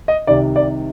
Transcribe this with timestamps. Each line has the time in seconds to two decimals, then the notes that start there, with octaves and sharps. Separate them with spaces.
0.08 D#5
0.27 C2 C3 D#3 D5
0.56 D5